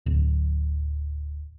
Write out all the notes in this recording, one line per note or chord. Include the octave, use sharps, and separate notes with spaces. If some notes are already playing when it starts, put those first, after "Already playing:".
D1